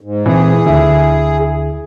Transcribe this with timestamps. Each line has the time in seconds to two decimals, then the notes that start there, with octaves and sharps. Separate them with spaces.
0.01 G#2
0.26 A#2 E3 C4 E4 G#4
0.66 D2 D3 E4